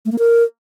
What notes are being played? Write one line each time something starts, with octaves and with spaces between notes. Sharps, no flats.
A3
A#3
A#4